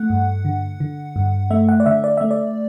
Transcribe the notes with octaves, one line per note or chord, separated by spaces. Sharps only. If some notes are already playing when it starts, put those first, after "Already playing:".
Already playing: A3 F#5
G2
D3
D3
G2
A3 E5
F#5
D5
D3 E5
D5
A3 E5
D5